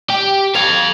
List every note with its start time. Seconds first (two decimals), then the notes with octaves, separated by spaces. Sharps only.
0.10 G4
0.55 A4 F5 G#6 F7